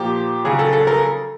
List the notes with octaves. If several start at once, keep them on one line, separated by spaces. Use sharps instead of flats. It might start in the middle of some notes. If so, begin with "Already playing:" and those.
Already playing: A#2 F3 G4
C#3 F#3 G#4
A4
A4
A#4